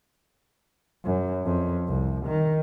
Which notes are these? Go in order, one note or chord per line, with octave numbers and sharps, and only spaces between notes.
F#2
F2
C2
D#3